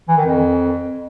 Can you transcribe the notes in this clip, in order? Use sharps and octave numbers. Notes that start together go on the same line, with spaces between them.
E3
D#3
F2